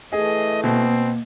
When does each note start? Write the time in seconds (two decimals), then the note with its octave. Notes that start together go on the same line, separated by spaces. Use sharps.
0.13 E3 A3 G#4 D#5
0.63 B2 A#3 C4